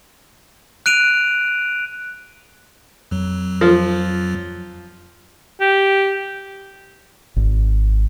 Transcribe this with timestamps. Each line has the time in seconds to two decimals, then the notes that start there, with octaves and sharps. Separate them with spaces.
0.86 F#6 D7 D#7 F7
3.11 F2 F#3
3.61 F3
5.61 G4
7.36 G#1